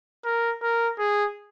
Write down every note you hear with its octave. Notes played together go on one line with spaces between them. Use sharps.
A#4
A#4
G#4